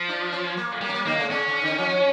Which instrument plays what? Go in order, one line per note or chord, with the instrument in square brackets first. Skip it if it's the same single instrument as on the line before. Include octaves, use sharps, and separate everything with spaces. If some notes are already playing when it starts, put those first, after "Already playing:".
Already playing: [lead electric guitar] F3
[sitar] D4
C#4
A#3
[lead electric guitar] G3 [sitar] A#3
[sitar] C#4
A#3
[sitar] D3 [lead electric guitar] A#3
[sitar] C#3
[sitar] C#3 [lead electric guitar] C#4
[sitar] C#3
D3
F3